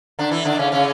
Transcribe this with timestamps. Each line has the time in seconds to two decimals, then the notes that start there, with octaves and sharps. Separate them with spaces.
0.19 D3 D4
0.32 E3 E4
0.45 D3 D4
0.59 C#3 C#4
0.72 C#3 C#4